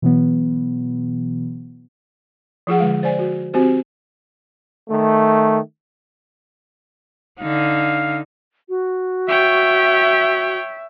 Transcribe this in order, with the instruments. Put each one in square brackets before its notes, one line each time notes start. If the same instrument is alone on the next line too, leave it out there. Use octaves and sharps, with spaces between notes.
[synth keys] B2 E3 F#3 B3
[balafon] F3 F4 G#4 F#5
D3 G#3 F5
C5 D5 G#5
F#4
C4 F#4 G4 C5
[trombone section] D#3 A3
[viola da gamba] D3 D#4 [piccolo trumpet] F5
[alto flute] F#4
[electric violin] C#5 G5 [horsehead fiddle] E5